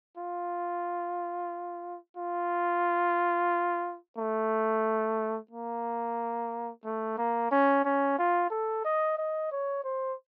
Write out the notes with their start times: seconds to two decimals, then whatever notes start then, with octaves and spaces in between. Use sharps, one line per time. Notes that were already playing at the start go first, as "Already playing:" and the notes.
0.18 F4
2.17 F4
4.18 A3
5.51 A#3
6.85 A3
7.18 A#3
7.51 C#4
7.85 C#4
8.18 F4
8.50 A4
8.85 D#5
9.17 D#5
9.51 C#5
9.84 C5